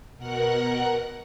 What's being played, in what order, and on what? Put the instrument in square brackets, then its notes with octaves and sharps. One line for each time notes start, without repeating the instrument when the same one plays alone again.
[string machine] B2 A#4 F#5 F#6